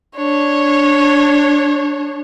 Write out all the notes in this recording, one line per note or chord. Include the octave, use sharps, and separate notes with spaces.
D4 C#5